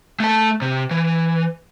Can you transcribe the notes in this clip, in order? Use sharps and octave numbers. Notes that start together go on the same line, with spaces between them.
A3 A5
C3
E3